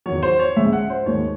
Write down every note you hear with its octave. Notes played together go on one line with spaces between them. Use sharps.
E2 D#3 F#3 C#5
C5
C#5
C#2 C#3 G#3 E5
F#5
C5
D#2 D#3 G#3 C#5